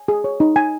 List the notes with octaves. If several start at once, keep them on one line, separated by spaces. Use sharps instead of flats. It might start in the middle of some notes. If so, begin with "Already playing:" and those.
Already playing: G#5
G#4
C#5
D#4
G#5